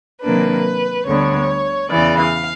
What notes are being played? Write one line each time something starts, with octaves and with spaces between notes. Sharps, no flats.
C3 D#3 F#3 A#3 D4 B4
D2 D3 G3 B3 D4 C#5
E2 C#3 E3 D5
F5